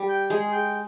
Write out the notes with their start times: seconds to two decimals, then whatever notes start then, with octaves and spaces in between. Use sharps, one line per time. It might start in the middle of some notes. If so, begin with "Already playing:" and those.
Already playing: G3
0.08 G5
0.30 G#3 G#4
0.52 G5